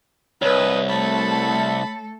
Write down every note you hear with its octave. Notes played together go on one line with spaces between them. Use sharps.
C2 B4 C#5 D#5
A3 A4 A5 B5